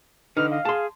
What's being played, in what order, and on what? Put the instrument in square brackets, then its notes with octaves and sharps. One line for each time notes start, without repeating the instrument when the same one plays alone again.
[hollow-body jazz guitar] D3 D#4 [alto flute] B4 [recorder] F6
[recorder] D#5 [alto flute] F5
[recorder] G#4 [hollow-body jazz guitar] A5 C6